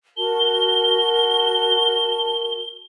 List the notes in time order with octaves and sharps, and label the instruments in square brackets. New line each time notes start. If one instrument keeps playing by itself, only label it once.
[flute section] F#4 A#4 A5 [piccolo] G7